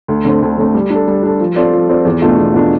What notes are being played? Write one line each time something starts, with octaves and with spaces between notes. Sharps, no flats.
D2
D3 A3 C4
D2
D3 A3 C4
G3
D4 A4
G3
D4 A4
F3
C4 F4 A4 D5
F3
C4 F4 A4 D5
E2
B2 A3 D4 F4
E2
B2 A3 D4 F4